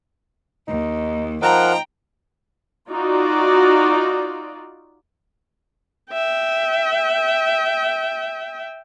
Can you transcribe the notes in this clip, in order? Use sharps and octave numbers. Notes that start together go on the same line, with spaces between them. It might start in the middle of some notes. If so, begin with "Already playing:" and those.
D#2 D#4
F3 D#4 A#4 F#5 G5 A#5
D#4 F4 F#4 D5
E5 G5